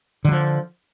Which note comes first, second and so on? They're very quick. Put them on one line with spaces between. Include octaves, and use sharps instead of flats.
D3 F#3 F3